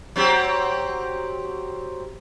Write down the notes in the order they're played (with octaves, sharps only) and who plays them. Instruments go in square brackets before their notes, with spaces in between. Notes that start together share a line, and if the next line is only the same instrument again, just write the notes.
[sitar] F#3 C4 G4